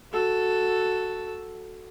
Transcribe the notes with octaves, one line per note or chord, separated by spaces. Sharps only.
F#4 A4